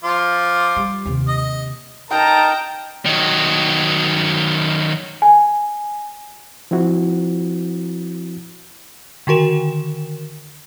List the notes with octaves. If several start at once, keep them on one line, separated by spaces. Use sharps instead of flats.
F3 F4 D6
G3
D#2 C3
D#5
D#4 A#4 G5 A5 A#5
D#3 F#3
G#5
F3 C4 E4 F#4
D3 D#3 F#4 A#4 E7